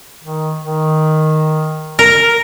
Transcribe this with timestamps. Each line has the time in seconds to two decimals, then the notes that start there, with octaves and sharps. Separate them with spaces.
0.24 D#3
0.65 D#3
1.99 A#4